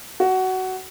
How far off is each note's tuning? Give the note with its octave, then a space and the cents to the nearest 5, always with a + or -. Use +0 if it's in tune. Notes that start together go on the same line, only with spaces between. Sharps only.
F#4 +15